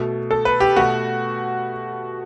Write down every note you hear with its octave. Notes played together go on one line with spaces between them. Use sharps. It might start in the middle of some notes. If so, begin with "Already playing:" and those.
Already playing: B2 A3
A4
B4
G4
B2 A3 F#4